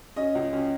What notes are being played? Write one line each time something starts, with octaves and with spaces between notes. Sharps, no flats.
C#4 D#5
C#2
C#4